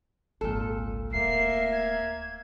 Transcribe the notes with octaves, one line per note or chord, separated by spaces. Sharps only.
G#1 C#2 A#2 A4
D1 A3 A#3 E5 C7
G#6